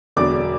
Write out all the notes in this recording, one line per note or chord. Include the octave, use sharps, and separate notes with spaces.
E1 E2 D3 F#3 D5 D6